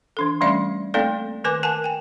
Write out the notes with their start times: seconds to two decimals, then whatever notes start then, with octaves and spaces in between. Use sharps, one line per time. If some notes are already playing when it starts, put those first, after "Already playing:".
0.17 E3 D4 A4
0.41 E3 G3 A3 C#4 D5 E5
0.94 A3 A#3 C4 D#4 A4 D5
1.44 D#3 A#4 B4 G#5 D6
1.63 A#4 F#5 G#5 A5
1.84 G5 G#5